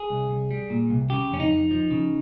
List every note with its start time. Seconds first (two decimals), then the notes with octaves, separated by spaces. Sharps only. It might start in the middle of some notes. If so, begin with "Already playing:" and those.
Already playing: G#4
0.10 C2
0.30 C2
0.51 G3
0.70 A#2
0.90 C2
1.10 C#3 G4
1.31 F2 C#4
1.40 D#4
1.51 F2
1.71 F3
1.91 C#3